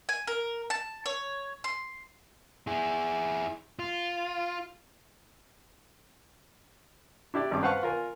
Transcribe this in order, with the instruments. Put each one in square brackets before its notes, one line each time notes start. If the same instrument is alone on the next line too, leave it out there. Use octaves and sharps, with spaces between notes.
[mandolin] G#5
A#4
A5
C#5
C6
[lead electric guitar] E4 G#4
F4
[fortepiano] D4 E4 G4 D5
G#1 G2 C#4 D6
B4 C5 F5 F#5 A5 C#6
F4 A#4 G#5